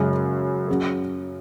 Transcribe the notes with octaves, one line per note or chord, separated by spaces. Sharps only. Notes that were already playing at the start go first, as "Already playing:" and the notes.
Already playing: F#2 C#3 G#3
F#3 C#4 G#4